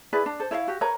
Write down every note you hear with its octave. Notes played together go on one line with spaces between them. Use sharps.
E4 G#4 B4 D5
D4
A4 C5
E4 C#5 D#5 F5
F#4 G4
A#4 B4 C#5 A#5